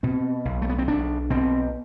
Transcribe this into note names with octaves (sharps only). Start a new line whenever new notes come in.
B2 C4
B1
A3
B3
C4
B1 D4
B2 C4